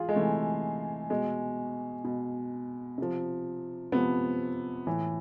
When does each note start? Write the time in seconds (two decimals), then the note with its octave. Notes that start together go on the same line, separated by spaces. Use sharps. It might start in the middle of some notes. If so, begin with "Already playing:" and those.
Already playing: E3 F4 G#4
0.09 G#3
0.15 C3 E3 A3
1.10 B2 G#3
2.04 B2
2.98 C3 F3
3.92 C3 F3 B3
4.87 A2 E3